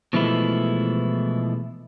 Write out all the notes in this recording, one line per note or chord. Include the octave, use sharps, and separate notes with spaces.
B2 E3 F3 G#3 A3 E4